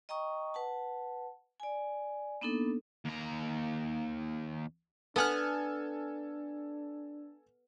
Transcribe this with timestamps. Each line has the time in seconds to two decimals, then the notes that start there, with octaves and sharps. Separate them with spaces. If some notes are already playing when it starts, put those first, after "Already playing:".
0.09 D#5 G5 A#5 C#6 D#6
0.54 B4 F#5 A5
1.60 D5 G#5
2.41 A#3 B3 D4 D#4 A4
3.05 D#2 A#5
5.16 B3 D4 A4 F#5 G#5 F6